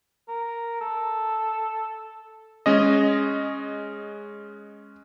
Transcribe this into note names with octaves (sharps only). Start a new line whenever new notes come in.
A#4
A4
G#3 C#4 D#5